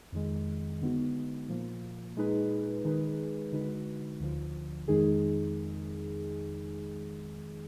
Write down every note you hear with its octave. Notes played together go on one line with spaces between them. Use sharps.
F2 D#3 G#3
D3 G#3 B3 D#4 F#4
A#2 F3 A#3
A#2 G#3 D#4 G#4 B4
D#3 G#3 D#4 G#4 B4
D3 G#3 D#4 F#4 B4
D2 D3 F3
F2 D#3 G#3 D#4 G#4